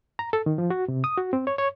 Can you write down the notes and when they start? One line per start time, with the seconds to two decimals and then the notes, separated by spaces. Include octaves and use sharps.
0.19 A#5
0.33 A4
0.46 D#3
0.58 F3
0.70 F#4
0.88 C3
1.04 D#6
1.18 F#4
1.33 C4
1.47 C#5
1.58 C#5